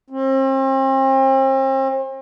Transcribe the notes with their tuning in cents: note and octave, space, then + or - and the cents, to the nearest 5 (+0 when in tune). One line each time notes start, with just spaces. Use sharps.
C4 +40